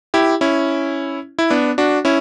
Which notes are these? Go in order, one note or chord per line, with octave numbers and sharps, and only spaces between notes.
E4 G4
C#4 E4
E4
B3 D4
D4 F#4
C#4 E4